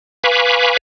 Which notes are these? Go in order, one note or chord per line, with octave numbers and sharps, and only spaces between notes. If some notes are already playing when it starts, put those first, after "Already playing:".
B4 F5 G#5 B5 C#6 D6